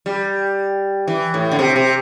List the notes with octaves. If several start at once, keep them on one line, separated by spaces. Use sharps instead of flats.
G3
E3
A2
D3
C3
C3